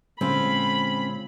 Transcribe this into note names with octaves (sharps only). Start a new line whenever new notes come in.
A#2 D3 G#3 C4 C#4 F4 B5